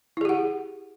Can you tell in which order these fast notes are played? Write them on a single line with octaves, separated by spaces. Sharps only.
E4 G#4 G4 F#5